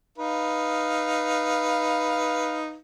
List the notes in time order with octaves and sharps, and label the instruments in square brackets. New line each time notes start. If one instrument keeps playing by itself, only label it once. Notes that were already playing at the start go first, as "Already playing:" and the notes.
[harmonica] D#4 B4 F5